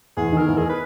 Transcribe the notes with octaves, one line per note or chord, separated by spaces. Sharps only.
E2 G#4
D#3
A#4
E2
G#4
B4